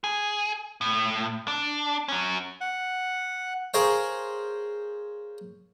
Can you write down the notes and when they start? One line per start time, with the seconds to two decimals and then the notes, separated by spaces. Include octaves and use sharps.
0.04 G#4
0.81 A2
1.48 D4
2.08 F#3 C#4
2.61 F#5
3.74 G#4 A#4 C5 C#5 F5 G5